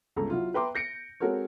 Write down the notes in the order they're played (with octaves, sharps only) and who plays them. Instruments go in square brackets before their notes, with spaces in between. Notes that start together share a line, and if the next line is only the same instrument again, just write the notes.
[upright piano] G1 C#2 A4 A#5
F#3 E4 F4
B4 E5 G5 A#5 C6 D6
G6 A#6 C#7 D7
G#3 C4 F#4 A4 A#4 C#5